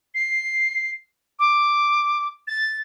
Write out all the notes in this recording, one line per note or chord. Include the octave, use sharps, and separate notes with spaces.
C7
D6
A6